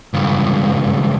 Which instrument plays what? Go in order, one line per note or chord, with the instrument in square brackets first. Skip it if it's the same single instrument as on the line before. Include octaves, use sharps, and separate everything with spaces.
[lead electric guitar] C#2 G2